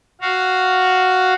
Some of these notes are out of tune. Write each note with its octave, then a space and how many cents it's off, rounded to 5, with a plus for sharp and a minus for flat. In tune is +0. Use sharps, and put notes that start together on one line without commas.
F#4 +0 F5 +0